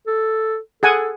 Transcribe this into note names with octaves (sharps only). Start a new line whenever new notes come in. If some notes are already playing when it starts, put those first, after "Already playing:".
A4
G#4 A4 F#5 G#5